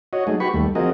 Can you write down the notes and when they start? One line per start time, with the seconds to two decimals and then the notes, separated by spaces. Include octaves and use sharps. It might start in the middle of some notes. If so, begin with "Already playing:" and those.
0.13 F#4 C#5 D#5
0.27 F#3 A3 D#4 G#4
0.40 F#4 G4 B4 B5 C#6
0.54 D#2 G3 A3
0.75 F3 C4 F#4 G#4 A#4 D#5